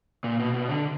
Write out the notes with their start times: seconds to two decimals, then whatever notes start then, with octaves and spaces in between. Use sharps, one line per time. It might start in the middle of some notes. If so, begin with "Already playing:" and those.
0.24 A#2
0.40 B2
0.54 B2
0.69 D3